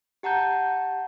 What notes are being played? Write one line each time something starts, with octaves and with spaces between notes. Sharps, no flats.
G4 F#5 A5 A#5 G6